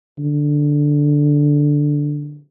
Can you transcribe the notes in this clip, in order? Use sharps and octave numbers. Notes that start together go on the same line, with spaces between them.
D3